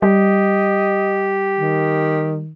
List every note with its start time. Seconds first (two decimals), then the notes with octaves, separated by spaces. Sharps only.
0.02 G3 G4 D#5
1.59 D#3